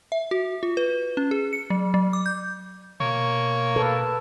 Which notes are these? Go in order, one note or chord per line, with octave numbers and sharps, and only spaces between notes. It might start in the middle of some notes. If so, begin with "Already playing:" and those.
E5
F#4
F4
B4
C#4
G#4
C#7
F#3
F#3
D6
G6
B2 A#3 C#5
A4 B4 F5